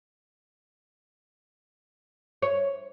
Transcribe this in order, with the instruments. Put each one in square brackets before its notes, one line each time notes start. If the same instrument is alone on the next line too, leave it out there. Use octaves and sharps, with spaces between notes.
[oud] C#5